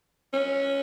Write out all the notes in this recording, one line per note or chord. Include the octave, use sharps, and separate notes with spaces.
C#4